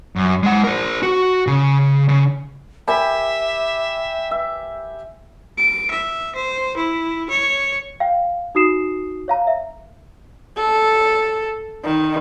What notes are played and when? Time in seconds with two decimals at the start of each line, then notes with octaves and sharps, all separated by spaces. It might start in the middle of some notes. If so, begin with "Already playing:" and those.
0.16 F#2
0.43 G#3 F#5
0.64 A#4 C5
1.02 F#4
1.47 C#3
2.09 C#3
2.88 G4 A#4 E5 G#5 B5
4.31 E5
5.58 D7
5.91 E5
6.36 C5
6.77 E4
7.30 C#5
8.00 F5 G5
8.55 D#4 F#4 D#6 C7 E7
9.28 C#5 F5 A#5
9.47 E5
10.58 A4
11.84 D#3